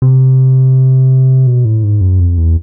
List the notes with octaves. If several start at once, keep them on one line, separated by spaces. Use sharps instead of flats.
C3
B2
A2
G#2
F#2
F2
E2